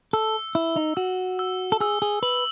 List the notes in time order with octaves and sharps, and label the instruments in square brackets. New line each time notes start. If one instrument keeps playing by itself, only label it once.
[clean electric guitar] A4 [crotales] E6
[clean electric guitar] E4 [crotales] E6
[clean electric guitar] D#4
[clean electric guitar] F#4 [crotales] E6
[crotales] E6
[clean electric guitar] A4
[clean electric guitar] G#4 [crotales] E6
[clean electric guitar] G#4
[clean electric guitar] B4 [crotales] F#7